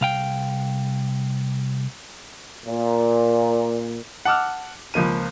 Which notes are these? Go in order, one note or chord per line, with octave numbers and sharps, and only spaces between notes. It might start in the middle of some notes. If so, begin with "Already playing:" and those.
C2 F5 G5
A#2
F#5 A5 D6 E6 F6
C#2 F3 A#3 D#7